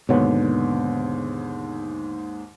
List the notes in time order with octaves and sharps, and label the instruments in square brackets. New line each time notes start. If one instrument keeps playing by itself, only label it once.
[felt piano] D#2 G#2 C#5 [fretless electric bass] B2 D3 B3